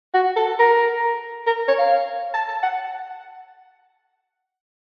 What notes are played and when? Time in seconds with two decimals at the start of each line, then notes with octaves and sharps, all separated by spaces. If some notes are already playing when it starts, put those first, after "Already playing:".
0.14 F#4
0.37 A4
0.59 A#4
1.47 A#4
1.68 C#5
1.79 F5
2.34 A5
2.49 A5
2.63 F#5